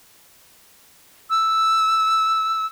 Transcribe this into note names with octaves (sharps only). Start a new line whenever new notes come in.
E6